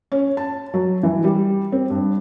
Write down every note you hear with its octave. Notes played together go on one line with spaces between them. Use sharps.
C#4
A5
F#3
E3
G3
C4
G2